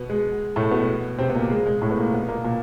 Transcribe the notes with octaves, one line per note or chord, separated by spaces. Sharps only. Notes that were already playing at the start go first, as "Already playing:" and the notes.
Already playing: B2 B3
G#3
A2 A3
B2 B3
C3 C4
B3
A#2 A#3
G#3
G#3
A2 A3
B3
A#2 A#3
B2 B3
A#2 A#3
A#2 A#3